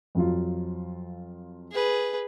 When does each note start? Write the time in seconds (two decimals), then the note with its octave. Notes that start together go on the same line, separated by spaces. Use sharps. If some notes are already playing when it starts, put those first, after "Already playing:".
0.15 F2 F#3 F4
1.72 G#4 B4